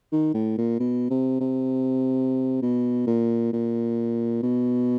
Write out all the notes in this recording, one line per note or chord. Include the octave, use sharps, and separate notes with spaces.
D#3
A2
A#2
B2
C3
C3
B2
A#2
A#2
B2